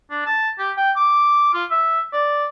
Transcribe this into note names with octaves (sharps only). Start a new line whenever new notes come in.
D4
A5
G4
G5
D6
F4
E5
D5